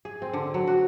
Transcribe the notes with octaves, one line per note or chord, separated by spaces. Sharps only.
G#4
C4
D3
F#3
F#4